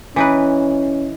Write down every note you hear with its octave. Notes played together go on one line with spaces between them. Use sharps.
E3 C#4 D#4 B4